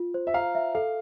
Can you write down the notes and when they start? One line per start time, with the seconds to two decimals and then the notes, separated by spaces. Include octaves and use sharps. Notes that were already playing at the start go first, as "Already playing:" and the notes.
Already playing: F4
0.14 C5
0.27 E5
0.34 F5 A#5
0.55 E5
0.75 A4 F5